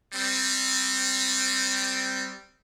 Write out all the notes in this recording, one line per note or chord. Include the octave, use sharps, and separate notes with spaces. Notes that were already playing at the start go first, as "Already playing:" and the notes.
G3 C4